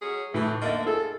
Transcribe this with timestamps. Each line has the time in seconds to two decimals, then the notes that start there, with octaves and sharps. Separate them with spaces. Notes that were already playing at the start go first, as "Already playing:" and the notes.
0.02 F#3 C#4 G#4
0.34 A2 E3
0.62 D3 A#3 D#5 E5 A6
0.86 G#4 A4